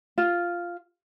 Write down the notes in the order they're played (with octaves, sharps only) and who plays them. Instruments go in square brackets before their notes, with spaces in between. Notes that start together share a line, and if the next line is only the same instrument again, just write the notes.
[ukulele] F4